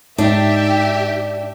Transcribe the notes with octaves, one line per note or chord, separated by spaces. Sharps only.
G#2 D4 D#4 G4 E5